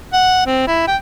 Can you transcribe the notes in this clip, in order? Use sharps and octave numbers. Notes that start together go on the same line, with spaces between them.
F#5
C4
E4
G5